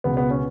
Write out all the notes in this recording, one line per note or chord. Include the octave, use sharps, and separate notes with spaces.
C#2 B2 B3
B3
C#4